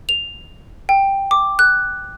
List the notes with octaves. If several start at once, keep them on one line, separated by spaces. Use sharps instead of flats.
F7
G5
D6
F#6